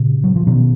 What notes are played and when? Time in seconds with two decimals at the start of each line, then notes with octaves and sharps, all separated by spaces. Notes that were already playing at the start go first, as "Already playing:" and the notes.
Already playing: A#2 C#3
0.24 F#3
0.36 F3
0.47 B2 D#3